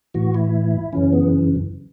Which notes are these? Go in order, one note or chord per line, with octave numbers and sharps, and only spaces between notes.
A2 E3 F#4
E4
F#2 C#3 E3 C#4
B3